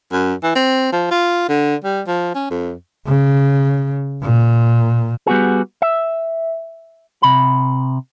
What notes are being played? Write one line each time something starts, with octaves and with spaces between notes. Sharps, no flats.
F#2
E3
C4
F3
F4
D3
G3
F3
C#4
F2
C#3
A#2
G3 B3 F#4 G#4
E5
C3 B5